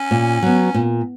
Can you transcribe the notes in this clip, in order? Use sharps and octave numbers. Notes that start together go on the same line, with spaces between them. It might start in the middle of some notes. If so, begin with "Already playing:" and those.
Already playing: C#4
A#2
F#3 B3
A#2